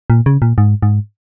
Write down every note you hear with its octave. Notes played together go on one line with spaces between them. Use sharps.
A#2
C#3
A#2
G#2
G#2